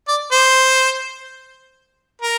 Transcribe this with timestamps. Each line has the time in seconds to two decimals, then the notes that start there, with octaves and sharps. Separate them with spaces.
0.08 D5
0.32 C5
2.22 A#4